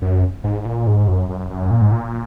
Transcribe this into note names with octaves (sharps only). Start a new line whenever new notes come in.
F#2
G#2
A#2
G#2
F#2
F#2
F#2
A#2
G#2
A#2